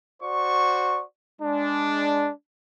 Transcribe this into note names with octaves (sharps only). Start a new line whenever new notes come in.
F#4 C5 D5 C#6
G#3 D4